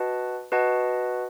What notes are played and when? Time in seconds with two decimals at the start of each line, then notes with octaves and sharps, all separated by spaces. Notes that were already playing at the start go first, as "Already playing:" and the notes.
Already playing: F#4 B4 D#5 F#5 A5
0.52 F#4 B4 D#5 F#5 A5